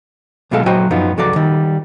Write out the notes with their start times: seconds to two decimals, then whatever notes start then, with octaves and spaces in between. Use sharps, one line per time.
0.51 B1 B2 F#3 G#3 A4 F5
0.66 A#2 F#3 F#4 C5 D#5 G5
0.91 F#2 F3 F#3 B3 D#4 F4
1.18 C#2 F#3 F#4 A4 D5 A#5
1.36 D#3 G3